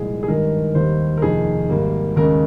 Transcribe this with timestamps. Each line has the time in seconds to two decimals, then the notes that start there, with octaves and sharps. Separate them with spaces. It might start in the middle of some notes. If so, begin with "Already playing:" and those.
Already playing: C2 A#2 F3 G#3 G#4
0.23 G#4
0.28 G#1 G2 D#3 G#3 A#4
0.75 D#2 D#3 G3 A#3 C5
1.17 A#4
1.22 F1 F2 D#3 A#3 G#4
1.70 G#1 G#2 G3 A#3
2.16 D#2 C#3 G#3 A#4